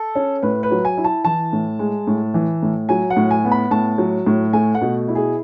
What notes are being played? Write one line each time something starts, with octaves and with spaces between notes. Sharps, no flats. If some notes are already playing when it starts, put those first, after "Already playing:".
Already playing: A4
C#4
A2 B4
B4
F#3
G#5
E4
A5
E3 A5
A2
G#3
A2
E3
A2
F#3 G#5
F#5
A2
G#5
B3
B5
A2 A5
F#3
A2
A3 G#5
F#5
B2
E4
G#4